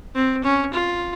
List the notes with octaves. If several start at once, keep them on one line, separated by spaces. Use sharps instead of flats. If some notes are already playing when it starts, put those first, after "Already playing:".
C4
C#4
F4